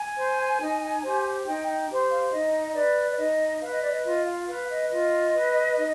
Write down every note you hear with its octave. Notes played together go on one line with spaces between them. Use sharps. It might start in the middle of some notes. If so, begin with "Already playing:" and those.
Already playing: G#5
C5
D#4
G4 C5
D#4 G5
G5
G4 C5
F5
D#4 D#5
B4 D5
D5
D#4 D#5
B4 F5
D#5
D5
D#5
F4 D#5
F5
B4 F5
D#5
F4 D#5
B4
D#4